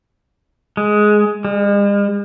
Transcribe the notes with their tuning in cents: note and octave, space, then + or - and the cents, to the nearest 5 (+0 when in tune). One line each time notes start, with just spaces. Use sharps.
G#3 +10
G#3 -45